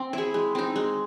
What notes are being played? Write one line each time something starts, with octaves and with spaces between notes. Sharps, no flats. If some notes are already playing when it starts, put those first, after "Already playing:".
Already playing: C4
E4 G#4
G#3
C4 D#4
G#3